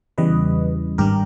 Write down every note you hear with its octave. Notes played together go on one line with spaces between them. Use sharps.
E2 C#3 E3 G3 B4 D#5
G#1 G2 G3 G4 A#4